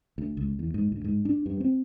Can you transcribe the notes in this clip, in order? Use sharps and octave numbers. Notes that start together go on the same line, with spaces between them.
D2
C#2
E2
G#2
D2
G#2
D4
G2
C4